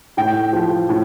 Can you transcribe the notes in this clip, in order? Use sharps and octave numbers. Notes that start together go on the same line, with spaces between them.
A2 G5
F3
A2